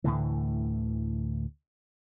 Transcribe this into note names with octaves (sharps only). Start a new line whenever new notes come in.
D2 A2 D3 E3